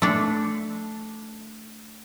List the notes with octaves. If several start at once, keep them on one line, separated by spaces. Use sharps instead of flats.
A3 D4